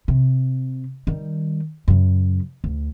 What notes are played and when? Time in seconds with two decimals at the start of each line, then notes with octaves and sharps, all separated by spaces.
0.08 C3
1.07 D#3 G3
1.88 F#2 C#3
2.64 D2